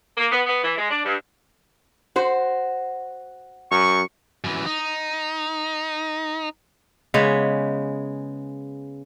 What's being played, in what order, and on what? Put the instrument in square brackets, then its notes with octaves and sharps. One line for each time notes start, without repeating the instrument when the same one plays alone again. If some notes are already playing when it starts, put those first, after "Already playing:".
[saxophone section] A#3
B3
B3
E3
G#3
D4
G2
[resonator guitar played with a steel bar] F#4 C5
[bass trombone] F#2 [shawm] C#6
[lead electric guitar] F#2 E3
D#4
[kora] C#3 G#3 B3 C#5